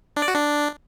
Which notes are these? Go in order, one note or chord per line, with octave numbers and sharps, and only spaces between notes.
D4
D5
F#4
D4